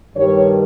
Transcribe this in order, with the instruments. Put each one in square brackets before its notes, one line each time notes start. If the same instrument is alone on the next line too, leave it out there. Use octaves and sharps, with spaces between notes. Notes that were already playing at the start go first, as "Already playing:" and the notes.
[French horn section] G2 D#3 G3 C#5